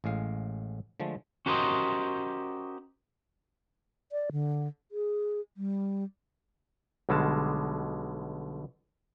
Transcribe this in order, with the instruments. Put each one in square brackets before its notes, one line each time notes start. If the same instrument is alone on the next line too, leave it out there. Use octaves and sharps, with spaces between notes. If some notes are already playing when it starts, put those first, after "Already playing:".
[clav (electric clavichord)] A1 A2 G#3 F5
D3 F3 G#3 A3
[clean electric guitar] C#4 F#4 G4 A#4 C5 D#5
[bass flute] D5
D3
G#4
G3
[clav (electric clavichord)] B1 B2 D3 G3 G#3 A5